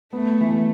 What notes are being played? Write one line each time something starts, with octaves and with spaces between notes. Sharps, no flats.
A3 B3
E3